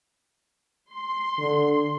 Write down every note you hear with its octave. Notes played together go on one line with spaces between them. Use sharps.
C6
D3